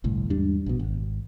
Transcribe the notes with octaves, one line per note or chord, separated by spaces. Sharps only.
G1 C2 A2
E2 G#2 G3 D4
A#1 B2
G#1